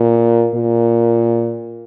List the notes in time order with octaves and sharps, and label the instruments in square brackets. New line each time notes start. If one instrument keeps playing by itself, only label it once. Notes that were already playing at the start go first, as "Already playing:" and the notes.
Already playing: [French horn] A#2
A#2